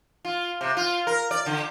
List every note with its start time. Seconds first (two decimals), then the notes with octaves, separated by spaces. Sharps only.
0.25 F4
0.61 C3
0.77 F4
1.07 A#4
1.31 D5
1.46 D3